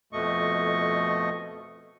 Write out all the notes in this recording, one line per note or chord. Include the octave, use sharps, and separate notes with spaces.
F2 B2 A3 D#5 C#6